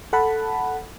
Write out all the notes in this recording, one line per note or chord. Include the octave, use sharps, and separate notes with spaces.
A4 F#5 A5 B5